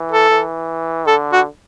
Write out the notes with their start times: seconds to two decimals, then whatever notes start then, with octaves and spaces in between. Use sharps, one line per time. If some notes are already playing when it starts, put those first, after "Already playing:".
Already playing: E3
0.11 A4
0.30 E3
1.07 D3 A4
1.32 F#4